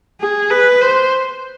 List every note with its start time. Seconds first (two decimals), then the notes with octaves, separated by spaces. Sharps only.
0.20 G#4
0.51 B4
0.81 C5